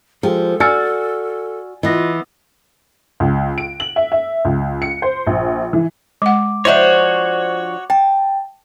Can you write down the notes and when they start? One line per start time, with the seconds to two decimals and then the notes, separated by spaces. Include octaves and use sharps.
0.23 F3 G#3 G4 A4
0.60 F#4 D5 G#5 E6 F6 A6 C#7
1.83 E3 B3 F4 D#5 A#6
3.20 C#2
3.58 D7
3.80 F#7
3.96 E5
4.12 E5
4.45 C#2
4.82 C#7
5.02 C5
5.27 A#1
5.73 E3
6.22 G#3 F#5 D6
6.65 F3 D4 E4 F#4 C5 C#5 D#5 E5
7.90 G5 A5